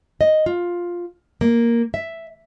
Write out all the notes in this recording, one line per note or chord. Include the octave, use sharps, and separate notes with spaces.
D#5
F4
A#3
E5